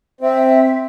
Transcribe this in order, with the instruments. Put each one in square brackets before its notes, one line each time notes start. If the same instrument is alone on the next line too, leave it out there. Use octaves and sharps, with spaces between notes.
[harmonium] C4 [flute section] E5